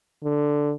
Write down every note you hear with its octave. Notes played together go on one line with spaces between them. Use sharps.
D3